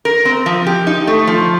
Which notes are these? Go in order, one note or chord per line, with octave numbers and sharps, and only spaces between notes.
A#4
C4
F3
G4
D#4
A3
F3